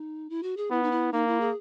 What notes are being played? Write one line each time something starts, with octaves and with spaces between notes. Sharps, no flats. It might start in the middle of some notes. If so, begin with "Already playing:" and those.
Already playing: D#4
E4
F#4
G#4
B3 E4
D#4
E4
A#3 D#4
E4
G#4